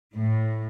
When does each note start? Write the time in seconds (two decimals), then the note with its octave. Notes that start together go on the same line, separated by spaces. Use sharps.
0.15 A2